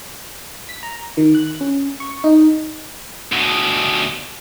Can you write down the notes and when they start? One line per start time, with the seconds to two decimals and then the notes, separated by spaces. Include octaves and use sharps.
0.69 B6
0.83 A#5
1.17 D#3
1.35 F#6
1.61 C#4
2.00 C#6
2.24 D#4
3.32 D2 B2